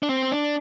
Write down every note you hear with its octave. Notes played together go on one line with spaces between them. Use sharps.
D4
C4
D4